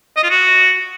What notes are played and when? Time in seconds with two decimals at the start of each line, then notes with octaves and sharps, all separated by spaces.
0.17 D#5
0.23 F4
0.30 F#4